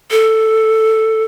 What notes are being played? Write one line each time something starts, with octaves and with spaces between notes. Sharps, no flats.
A4